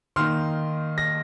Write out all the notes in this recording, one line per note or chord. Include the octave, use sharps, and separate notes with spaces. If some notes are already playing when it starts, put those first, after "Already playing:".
D#3 A#3 D#4 C6 F6
A#6